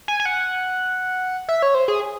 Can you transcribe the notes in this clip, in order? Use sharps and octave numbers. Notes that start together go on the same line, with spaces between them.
G#5
G#5
F#5
E5
C#5
C5
G#4